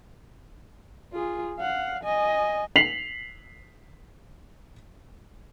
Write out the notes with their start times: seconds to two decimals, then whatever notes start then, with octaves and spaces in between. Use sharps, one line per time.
1.13 F4 G#4
1.59 F5 F#5
2.04 D#5 G#5
2.76 B6 C7 F7 F#7